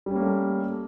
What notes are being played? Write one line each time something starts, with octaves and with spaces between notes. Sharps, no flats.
G3 A3 A#3 C#4